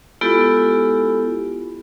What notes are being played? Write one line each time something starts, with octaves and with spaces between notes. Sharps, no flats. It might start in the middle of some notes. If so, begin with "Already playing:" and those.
G#3 B3 E4 F4 G4 A4